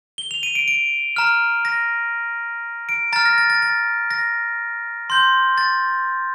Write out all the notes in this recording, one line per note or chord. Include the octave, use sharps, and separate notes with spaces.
G7
F7
D#7
D7
D7
A#5 F6
A#6
D7
A#5 F6 A6
A#6
A6
A6
A6
A#6
C6 G6
A6